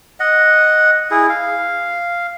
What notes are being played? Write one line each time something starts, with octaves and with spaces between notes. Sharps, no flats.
D#5 F#5
E4 G#4
F5